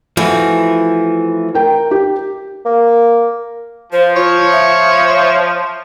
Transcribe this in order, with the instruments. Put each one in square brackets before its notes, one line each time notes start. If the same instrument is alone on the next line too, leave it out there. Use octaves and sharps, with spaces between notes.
[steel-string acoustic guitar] E3 [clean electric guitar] F3 A3 F#4
[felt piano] A#4 G5
G4
[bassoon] A#3
[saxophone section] F3 [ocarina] C5
[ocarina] F4 [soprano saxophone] C#5
[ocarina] E5